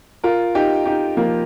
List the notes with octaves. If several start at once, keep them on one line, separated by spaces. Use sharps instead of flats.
F4 A#4
D#4 G4
D#4 G4
F3 A#3